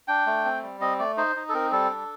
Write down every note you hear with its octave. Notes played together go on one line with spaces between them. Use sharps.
D4 G5
A3
C4
G3
C4 D#5
A3 D5
D#4 C5
D#4
A4
C4 A#4
G3 A4
D4